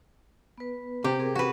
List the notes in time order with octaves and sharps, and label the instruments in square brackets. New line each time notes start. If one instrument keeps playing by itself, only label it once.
[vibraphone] B3 B4
[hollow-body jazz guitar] C3 [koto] G4
[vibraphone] C4 G#4 A#4
[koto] F#4 B4